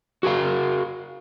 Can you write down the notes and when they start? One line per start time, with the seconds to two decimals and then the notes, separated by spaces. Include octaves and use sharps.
0.23 F#4 G#4 A#4 F5